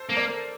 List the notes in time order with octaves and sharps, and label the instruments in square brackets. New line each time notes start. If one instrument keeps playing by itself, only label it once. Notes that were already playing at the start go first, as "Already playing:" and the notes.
Already playing: [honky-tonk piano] A4 C5
[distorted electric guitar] A#3
[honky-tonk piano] A#4 D5